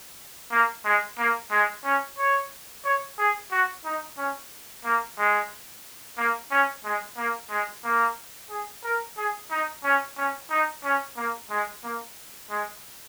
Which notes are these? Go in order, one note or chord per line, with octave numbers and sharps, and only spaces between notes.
A#3
G#3
A#3
G#3
C#4
C#5
C#5
G#4
F#4
D#4
C#4
A#3
G#3
A#3
C#4
G#3
A#3
G#3
A#3
G#4
A#4
G#4
D#4
C#4
C#4
D#4
C#4
A#3
G#3
A#3
G#3